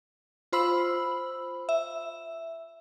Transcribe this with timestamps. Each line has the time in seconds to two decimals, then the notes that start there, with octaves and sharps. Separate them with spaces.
0.52 F4 C5 B5 E6 F#7
1.69 E5